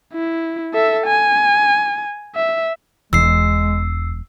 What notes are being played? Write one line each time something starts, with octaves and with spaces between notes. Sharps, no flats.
E4
A4 E5
G#5
E5
E1 E2 G#3 E6 C7